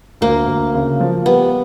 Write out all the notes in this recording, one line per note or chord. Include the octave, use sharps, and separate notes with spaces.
D2 A#3
D2
C#3
F3
G3 B3